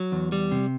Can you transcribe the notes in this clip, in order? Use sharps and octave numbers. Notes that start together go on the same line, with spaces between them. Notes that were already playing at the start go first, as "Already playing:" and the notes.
Already playing: F#3
E2
G3
C3